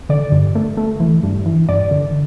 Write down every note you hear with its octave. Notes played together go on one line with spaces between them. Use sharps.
D3 D5
G2
A3
A3
E3
G2
E3
G2 D5
D3